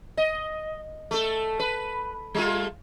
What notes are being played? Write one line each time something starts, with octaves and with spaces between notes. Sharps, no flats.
D#5
A3 A4
B4
G3 A3 F4